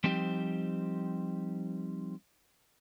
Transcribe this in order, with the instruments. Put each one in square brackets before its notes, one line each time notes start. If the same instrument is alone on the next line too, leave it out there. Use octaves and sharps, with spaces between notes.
[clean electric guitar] F3 G3 C4 D#4 G4